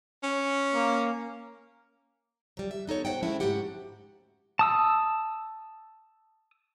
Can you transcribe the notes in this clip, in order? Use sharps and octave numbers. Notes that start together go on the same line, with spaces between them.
C#4
A#3
F#3 G3
E5
B3 D#4 A4 C#5
C5 D#5 F#5 G5
F3 G#3 A3 C4 C#4 E4
G#2 F#3 A3 F#4 G4 F#5
A5 D#6 E6